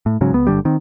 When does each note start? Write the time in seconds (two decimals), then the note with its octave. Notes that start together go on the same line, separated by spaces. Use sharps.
0.06 A2
0.21 G#2 C#3 F#3
0.33 C#2 B3
0.47 G1 C#2 D3 G3
0.65 D#3 C4